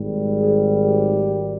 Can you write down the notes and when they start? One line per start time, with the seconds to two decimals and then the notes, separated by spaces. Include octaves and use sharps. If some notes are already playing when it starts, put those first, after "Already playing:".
Already playing: G#1 G#2 G3
0.38 G#4
0.83 G4